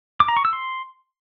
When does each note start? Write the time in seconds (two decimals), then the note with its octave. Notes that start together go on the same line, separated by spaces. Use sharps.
0.20 D6
0.28 A#5
0.37 C#6
0.45 E6
0.53 C6